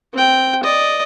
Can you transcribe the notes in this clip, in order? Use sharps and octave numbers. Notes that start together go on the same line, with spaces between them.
C4 G5
D5 D#5